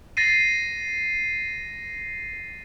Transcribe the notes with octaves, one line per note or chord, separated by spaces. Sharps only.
A6 A#6 C7 D#7